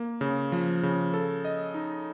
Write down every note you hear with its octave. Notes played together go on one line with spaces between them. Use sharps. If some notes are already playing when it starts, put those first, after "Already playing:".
Already playing: A#3
C#3
F3
C#3
A4
D#5
D#4